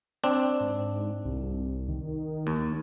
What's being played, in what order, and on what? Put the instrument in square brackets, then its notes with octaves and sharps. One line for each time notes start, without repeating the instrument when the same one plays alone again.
[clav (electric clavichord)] C4 D4
[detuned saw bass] G#2
C2
D#3
[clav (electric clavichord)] D#2